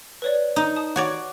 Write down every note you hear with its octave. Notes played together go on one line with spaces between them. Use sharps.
B4 C#5 D5
D#4
A5 D#6
F#4 C#5 D5